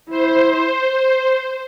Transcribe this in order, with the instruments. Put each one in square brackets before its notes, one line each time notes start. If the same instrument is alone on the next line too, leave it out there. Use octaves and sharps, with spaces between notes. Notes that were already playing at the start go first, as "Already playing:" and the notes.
[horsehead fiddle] E4 [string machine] C5